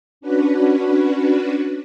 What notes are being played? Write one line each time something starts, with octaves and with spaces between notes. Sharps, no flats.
C#4 D4 F#4 B4